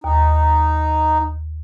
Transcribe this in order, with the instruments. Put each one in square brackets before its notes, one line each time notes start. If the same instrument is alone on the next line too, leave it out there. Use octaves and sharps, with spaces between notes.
[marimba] D#2 [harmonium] D#4